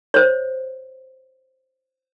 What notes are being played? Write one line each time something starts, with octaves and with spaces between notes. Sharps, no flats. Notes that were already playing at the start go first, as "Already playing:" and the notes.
C5 C#5